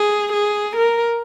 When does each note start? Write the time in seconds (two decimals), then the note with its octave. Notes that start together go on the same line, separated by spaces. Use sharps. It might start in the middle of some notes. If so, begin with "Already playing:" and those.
Already playing: G#4
0.33 G#4
0.76 A#4